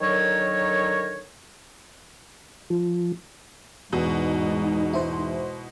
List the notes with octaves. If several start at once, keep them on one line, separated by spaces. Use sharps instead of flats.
D3 D#3 F#3 A#4 C#5
F3
E2 G#2 B2 D#4
E4 C5